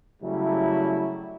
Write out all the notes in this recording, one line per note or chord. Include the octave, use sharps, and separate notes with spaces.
C#3 F#3 G3 A3 E4